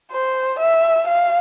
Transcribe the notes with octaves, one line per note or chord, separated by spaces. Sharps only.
C5
E5
F5